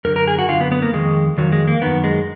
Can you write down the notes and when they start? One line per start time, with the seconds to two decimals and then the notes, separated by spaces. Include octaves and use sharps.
0.05 F#2 D3 A#4
0.16 A#4
0.27 G#4
0.39 F#4
0.49 F#2 D3 F4
0.61 B3
0.72 B3
0.82 A#3
0.93 F2 D#3 G#3
1.38 F2 D#3 F#3
1.52 G#3
1.67 A#3
1.82 F#2 D#3 B3
2.04 G#3